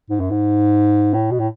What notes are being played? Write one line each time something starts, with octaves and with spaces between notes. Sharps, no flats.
G#2
F#2
G#2
A2
B2
A2